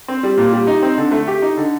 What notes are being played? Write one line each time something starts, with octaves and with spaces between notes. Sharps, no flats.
C4
G3
A#2
G3
D#4
C4
D3
A3
G4
D#4
D3